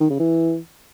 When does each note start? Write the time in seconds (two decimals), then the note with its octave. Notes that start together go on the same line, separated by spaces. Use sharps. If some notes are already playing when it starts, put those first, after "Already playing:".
0.01 D#3
0.10 C#3
0.20 E3